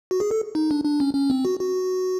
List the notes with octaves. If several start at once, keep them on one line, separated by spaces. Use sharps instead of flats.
F#4
G#4
A4
D#4
D4
D4
C#4
C#4
C4
F#4
F#4